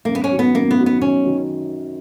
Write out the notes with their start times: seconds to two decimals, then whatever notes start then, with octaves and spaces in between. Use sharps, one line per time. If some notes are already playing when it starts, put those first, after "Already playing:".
0.05 F#2 A#3
0.15 B3
0.24 C#4
0.31 D#3 F#3
0.39 B3
0.55 F#2 A#3
0.71 B3
0.78 D#3 F#3
0.86 B3
1.01 F#2 C#4
1.25 D#3 F#3